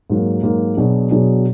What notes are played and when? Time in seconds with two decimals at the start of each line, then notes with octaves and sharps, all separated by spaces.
0.10 G#2 F#3 A#3
0.43 G#2 F#3 A#3
0.77 B2 F#3 D4 G#4
1.11 B2 F#3 D4 G#4